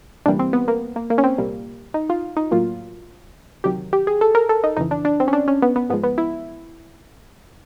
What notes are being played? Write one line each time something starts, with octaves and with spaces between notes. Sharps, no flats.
D2 C3 E3 G3 A#3 D4
C4
B3
A#3
A#3
A#3
C#4
C4
C2 A#2 G3 A#3
D#4
F4
D#4
A2 F#3 A#3 F4
D2 C3 D#3 F#3 G4
G4
G#4
A4
A#4
A4
D#4
F2 C#3 E3 D#4
D4
D4
C4
C#4
D4
C#4
B3
B3
G#2 F3 G#3 B3
B3
E4